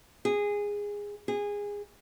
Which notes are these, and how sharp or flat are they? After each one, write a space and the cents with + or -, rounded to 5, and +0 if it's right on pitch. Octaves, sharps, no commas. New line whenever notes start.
G#4 -15
G#4 -20